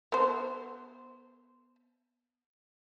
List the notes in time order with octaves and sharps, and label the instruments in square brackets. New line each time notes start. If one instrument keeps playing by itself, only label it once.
[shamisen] B3 C5